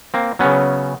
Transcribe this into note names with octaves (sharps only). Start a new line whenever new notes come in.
A#3 C4
C#3 F#3 B3 C#4